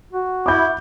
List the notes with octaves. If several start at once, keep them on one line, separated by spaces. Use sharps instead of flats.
F#4
E4 D6 G6